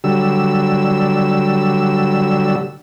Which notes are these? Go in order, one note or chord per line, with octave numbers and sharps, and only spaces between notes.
D3 F#3 G3 E6